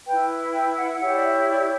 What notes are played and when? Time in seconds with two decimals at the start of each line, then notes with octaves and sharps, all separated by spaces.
0.06 E4 B4 G5
0.53 G5
0.77 F#5
1.00 E4 G4 C#5 F#5
1.14 D5
1.22 E5
1.46 D5